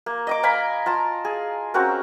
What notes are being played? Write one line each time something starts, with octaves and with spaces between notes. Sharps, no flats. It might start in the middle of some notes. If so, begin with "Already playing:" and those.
A#3
D#5 A#5 D6
F5 G#5 A#5 B5
F4 A5 A#5
G#4
C4 C#4 F#4 A#4